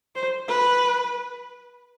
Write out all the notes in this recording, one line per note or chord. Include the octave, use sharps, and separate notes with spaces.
C5
B4